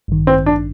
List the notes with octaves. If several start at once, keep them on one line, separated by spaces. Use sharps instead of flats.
A1 G2 D#3
C4
D4